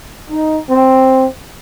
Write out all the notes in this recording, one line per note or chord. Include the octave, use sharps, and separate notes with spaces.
D#4
C4